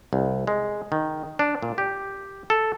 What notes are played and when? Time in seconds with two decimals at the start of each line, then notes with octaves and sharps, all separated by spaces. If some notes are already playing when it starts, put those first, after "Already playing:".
0.13 C2
0.47 G#3
0.92 D#3
1.39 D4
1.63 A#2
1.78 G4
2.50 A4